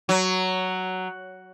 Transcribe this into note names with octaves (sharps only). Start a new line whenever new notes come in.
F#3